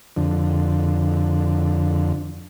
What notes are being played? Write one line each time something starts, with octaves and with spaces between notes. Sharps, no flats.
F2 D3